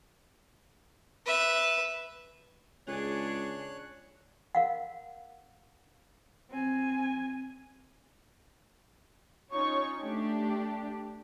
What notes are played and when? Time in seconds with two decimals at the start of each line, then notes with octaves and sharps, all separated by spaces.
1.25 B4 E5
2.87 C#2 D4 G#4 C#5 F#6
4.55 A#4 F5 F#5
6.50 C4 G#5
9.53 C#4 D#4 F4 C#5 C#6
10.01 A3 D4 G4